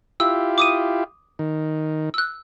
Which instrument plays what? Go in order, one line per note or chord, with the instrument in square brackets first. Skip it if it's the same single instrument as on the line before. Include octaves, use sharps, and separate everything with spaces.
[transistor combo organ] E4 F4 G4 [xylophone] E6
[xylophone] D6 D#6 D#7
[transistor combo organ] D#3
[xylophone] E6 F#6